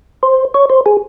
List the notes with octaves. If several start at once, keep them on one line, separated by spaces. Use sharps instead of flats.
C5
C#5
C5
G#4